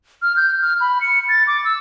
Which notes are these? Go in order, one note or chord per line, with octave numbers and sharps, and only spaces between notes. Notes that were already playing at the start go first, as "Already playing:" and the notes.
F6
G6
F6
B5
C#7
A6
D6
E6